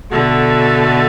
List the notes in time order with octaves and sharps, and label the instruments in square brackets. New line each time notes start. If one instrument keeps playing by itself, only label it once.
[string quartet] B2 D3 [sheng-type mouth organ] F#4 A4 E5